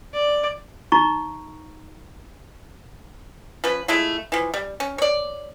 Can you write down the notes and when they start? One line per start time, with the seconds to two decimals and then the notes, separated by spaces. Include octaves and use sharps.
0.14 D5
0.92 D#4 A#5 C#6
3.64 F3 C#4 B4
3.88 G#3 A3 E4 F4
4.32 E3 F3
4.54 G3
4.80 C#4
4.98 C#5 D5